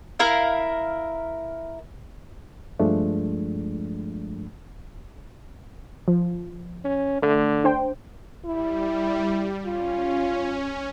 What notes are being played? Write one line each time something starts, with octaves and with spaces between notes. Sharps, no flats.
E4 A#4 F5
G2 F3 G#3 A3 D4
F3
C#4
D3 A3
D4 C5 G5
G3 E4
C#4 F4